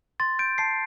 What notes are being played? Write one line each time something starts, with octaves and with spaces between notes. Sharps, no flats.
C6 A6
G6 D7
A5 C7